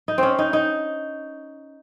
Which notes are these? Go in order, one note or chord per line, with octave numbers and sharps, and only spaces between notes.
D#4
C4 C#4
D#4
D#4